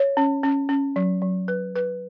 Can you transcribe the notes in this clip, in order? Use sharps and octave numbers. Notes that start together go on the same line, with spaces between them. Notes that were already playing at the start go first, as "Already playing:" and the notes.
Already playing: C#5
C#4
C#4
C#4
F#3
F#3
B4
B4